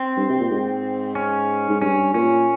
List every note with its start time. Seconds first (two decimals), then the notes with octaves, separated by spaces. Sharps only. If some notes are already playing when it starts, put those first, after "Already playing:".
Already playing: C4
0.17 G2
0.29 C3
0.40 A#2
0.50 G#2
1.15 C#4
1.70 G#2
1.81 G2 C#4
2.14 A#2 C#4